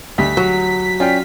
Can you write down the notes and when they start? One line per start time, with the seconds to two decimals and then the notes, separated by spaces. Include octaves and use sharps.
0.18 D2 G3 B6
0.37 F#3
1.00 C#4 F4 D5 G5